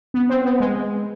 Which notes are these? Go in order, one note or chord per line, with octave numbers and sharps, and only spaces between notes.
B3
C4
B3
G#3